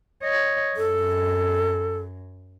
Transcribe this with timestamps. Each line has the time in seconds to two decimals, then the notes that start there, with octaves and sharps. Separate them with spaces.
0.23 C#5 D#5
0.77 F#2 A4